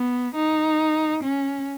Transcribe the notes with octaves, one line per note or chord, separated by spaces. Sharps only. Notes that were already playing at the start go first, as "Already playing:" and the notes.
Already playing: B3
D#4
C#4